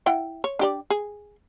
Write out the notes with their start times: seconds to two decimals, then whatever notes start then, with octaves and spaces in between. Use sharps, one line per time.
0.06 E4 F#5 G5
0.44 C#5
0.59 D4 G4 D5
0.90 G#4